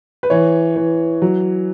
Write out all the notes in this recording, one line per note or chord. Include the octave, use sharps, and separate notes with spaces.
B4
E3 C#5
E3
F#3